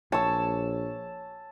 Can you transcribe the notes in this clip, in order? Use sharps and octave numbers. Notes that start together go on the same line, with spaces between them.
A#1 C#5 A5 E6